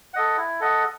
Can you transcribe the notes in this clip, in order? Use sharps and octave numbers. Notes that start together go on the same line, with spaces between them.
A4 D#5 F#5
E4
A4 D#5 F#5